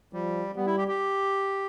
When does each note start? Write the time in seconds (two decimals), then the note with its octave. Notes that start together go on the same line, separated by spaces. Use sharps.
0.13 F3 G3
0.56 G3 B3
0.66 E4
0.77 G4
0.88 G4